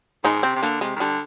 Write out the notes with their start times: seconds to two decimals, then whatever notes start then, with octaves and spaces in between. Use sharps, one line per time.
0.24 G#2 D#3 D#4
0.43 C3 C4
0.55 C3
0.63 D3 A#3
0.81 C3 G#3
0.96 D#3
1.00 D3 G3